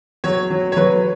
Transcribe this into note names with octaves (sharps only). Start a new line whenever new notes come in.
F#3 C#5
F#3
C#5
F#3 B4